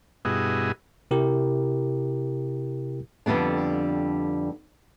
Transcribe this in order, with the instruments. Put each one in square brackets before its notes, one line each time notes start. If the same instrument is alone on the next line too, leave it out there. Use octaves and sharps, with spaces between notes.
[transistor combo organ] G2 B2 E4 F#4 G#4 D#5
[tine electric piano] C3 E4 G4 A#4
[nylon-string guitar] F2 D3 G3 B3 D4